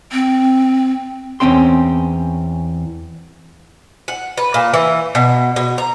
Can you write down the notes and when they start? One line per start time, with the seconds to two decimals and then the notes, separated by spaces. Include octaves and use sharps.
0.12 C4
1.40 E2 C4 C#4 G5 C6
4.08 F#5
4.38 B4
4.54 A#2
4.74 E3
5.15 B2
5.56 B2
5.78 A#5